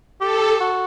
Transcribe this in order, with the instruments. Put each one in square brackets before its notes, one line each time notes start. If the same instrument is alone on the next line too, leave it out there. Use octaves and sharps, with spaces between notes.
[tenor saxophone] G4 [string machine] A4
[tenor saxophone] F#4